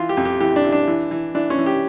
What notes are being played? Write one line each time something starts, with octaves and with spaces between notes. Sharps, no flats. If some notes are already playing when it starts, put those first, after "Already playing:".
Already playing: E3 F4
G4
F2
G4
E3 G4
D4
E3
D4
E3
E3
E3 D4
C#4
E3
G4